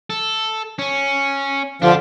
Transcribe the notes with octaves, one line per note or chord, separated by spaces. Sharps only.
A4
C#4
D3 F3 D4 F4 G4